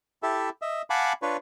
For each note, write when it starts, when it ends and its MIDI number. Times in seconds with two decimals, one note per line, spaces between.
0.23 0.49 64
0.23 0.49 67
0.23 0.49 69
0.23 0.49 76
0.62 0.82 75
0.62 0.82 76
0.90 1.13 77
0.90 1.13 78
0.90 1.13 80
0.90 1.13 81
0.90 1.13 83
0.90 1.13 86
1.22 1.37 62
1.22 1.37 65
1.22 1.37 71
1.22 1.37 73